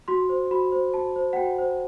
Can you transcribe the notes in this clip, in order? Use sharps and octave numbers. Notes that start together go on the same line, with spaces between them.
F#4 C6
C5
F#4 B5
C5
F#4 A5
C5
F#5
F#4 G5
C5